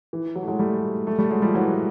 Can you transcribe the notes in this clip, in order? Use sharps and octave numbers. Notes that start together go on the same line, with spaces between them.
E3
E3 F#3
A3
F#3 G#3
G3 A3
G3 A3
G3 A3
F#3 G#3
F3 G3
E3 F#3